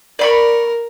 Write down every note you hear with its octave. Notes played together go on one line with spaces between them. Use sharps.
A#4 D5 B5 C#6